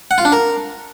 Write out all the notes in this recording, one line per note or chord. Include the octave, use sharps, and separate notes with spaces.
F#5
F4
D4
A#4